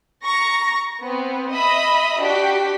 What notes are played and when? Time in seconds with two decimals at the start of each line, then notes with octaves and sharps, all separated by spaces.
0.23 A#5 C#6 A#6
1.04 B3 C4
1.53 D#5 E5 B5 D#6
2.21 D4 F#4 G4 B6